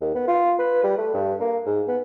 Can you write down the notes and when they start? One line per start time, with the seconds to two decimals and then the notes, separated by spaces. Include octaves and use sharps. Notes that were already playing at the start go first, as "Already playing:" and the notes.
0.01 D#2
0.15 B3
0.27 F4
0.59 B4
0.83 G3
0.98 A3
1.14 G2
1.40 A#3
1.66 G#2
1.88 B3